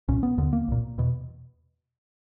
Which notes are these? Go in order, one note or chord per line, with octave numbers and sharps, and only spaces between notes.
C2 A#2 C#4
B3
D#2 D3 B3
A#3
C2 A#2
E2 B2